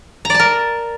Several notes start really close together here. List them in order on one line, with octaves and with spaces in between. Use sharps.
A#5 D5 A5 A#4